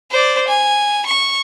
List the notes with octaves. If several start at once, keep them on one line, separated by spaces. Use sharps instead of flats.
C5 D5
G#5
C#6